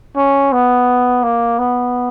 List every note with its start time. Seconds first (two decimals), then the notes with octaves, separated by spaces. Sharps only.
0.16 C#4
0.52 B3
1.23 A#3
1.59 B3